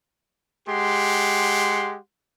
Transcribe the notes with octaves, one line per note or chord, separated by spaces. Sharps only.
G#3 G4 F#5 C6